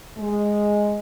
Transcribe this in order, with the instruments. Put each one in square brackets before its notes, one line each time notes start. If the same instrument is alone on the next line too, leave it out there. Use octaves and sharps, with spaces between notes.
[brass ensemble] G#3